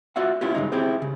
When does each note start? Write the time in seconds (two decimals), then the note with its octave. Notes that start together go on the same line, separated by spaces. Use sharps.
0.16 F4 F#4 D5 E5 F#5
0.41 B3 C#4 E4 F4 G4
0.55 G2 A#2 C#3 G#3 D#4
0.72 C4 E4 G4 G#4 C5
1.02 C#3